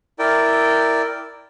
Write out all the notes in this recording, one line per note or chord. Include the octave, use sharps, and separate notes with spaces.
E4 A#4 D5 G5